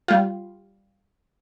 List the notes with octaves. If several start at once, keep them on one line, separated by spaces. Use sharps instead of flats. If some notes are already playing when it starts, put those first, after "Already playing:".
G3 F4